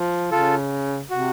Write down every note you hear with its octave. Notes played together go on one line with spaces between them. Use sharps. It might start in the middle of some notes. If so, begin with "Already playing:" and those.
Already playing: F3
C#3 F4 A4
C3 F#4